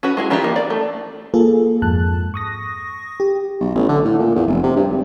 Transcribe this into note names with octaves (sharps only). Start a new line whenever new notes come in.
C#4 F#4 B4
G#3 E4 G#4
D#3 E3 D4 F4 G4
A#3 D#4
D5
A3
A#3 F4 G#4 A4
F2 G#2 A5 F#6
C#6 D#6 A#6
G4
B1
A1
D3
A2
A#2
E2
F1
C3
G2
G#1